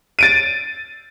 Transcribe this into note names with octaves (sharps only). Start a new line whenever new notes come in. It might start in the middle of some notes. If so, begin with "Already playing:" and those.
A6 D7 D#7